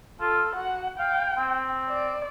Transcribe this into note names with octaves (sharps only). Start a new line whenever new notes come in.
F4 A4
F#4 F#5
F5 G5
C4
D5